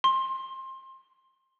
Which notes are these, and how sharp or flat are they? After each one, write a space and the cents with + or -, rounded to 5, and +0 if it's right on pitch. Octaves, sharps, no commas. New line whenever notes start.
C6 +20